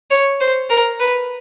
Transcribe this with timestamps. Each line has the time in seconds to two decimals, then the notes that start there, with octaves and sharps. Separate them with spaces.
0.10 C#5
0.40 C5
0.70 A#4
1.00 B4